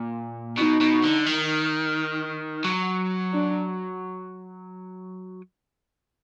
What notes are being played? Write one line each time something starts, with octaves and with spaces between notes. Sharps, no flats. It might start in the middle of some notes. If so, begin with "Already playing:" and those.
Already playing: A#2
B2 D#4
B2
D3
D#3
F#3
D4